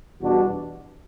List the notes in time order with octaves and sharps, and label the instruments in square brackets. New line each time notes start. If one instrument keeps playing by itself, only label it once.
[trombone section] E2 B2 G3 D4 F#4